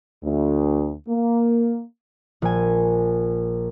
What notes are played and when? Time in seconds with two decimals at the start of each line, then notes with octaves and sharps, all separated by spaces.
0.23 D2
1.07 A#3
2.42 A#1 G#5